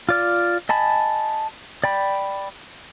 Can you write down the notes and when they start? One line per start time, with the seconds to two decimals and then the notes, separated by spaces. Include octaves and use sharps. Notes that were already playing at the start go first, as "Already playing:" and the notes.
0.09 F4 D5 F6
0.69 D#5 G#5 A5 B5
1.84 D5 G5 B5